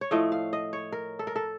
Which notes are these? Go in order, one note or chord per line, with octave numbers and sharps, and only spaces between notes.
C#5
A2 F3 A3 D#5
F5
D#5
C#5
A#4
A4
A#4
A4